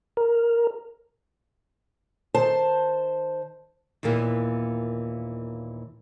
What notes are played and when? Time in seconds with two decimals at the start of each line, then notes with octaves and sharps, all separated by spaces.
0.17 A#4
2.34 D#3 C5 A5
4.03 D#2 A#2 E3 A#3 B3